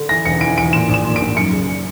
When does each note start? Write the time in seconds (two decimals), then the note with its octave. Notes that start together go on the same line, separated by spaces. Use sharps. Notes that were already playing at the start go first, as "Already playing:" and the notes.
Already playing: D3
0.09 E3 A#6
0.25 E1 C#7
0.41 E3 D7
0.57 E3 D7
0.73 A#2 E7
0.89 A#1 E7
1.05 A#2
1.16 A#1 D7
1.36 F#2 C#7
1.52 C#3